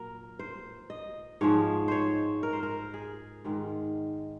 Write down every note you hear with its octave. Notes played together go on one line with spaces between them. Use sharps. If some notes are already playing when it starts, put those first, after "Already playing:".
Already playing: A#2 F#3 A#4
C5
D#5
G#2 F3 G#3 C#5
C5 C#5
A#4
C5
A#4
G#4
G#2 D#3 G#3